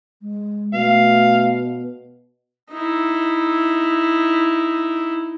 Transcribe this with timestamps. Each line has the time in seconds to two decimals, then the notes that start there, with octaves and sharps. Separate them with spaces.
0.22 G#3
0.74 B2 A3 F5
2.71 D#4 E4